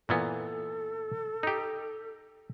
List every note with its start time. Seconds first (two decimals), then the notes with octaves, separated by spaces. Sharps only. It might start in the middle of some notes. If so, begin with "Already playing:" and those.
0.09 A#2 E3 B3 A4
1.43 D#4 G4